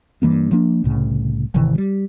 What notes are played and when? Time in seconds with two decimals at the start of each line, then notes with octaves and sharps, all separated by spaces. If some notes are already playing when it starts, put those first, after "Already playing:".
0.22 G2 E3 A#3 B3
0.52 F3 A#3 D4
0.84 C2 A2 C#3
1.54 G#1 C3 D#3 E3
1.75 F#3 G3